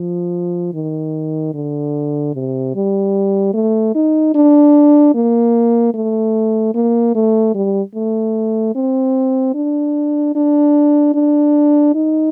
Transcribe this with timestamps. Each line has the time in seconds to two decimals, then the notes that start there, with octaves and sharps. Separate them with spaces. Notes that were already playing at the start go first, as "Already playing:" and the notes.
Already playing: F3
0.74 D#3
1.54 D3
2.35 C3
2.75 G3
3.54 A3
3.95 D#4
4.35 D4
5.15 A#3
5.94 A3
6.74 A#3
7.15 A3
7.54 G3
7.95 A3
8.75 C4
9.54 D4
10.35 D4
11.14 D4
11.95 D#4